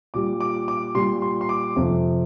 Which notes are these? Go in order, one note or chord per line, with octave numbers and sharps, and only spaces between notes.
A#2 G3 D6
D6
D6
A#2 G3 C6
C6
C6
D6
F2 C3 F3